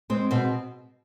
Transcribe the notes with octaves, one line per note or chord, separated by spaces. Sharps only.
G#3 C4
B2 C4